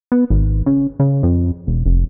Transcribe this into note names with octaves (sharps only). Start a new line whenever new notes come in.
B3
G#1
C#3
C#3
F2
E1
F1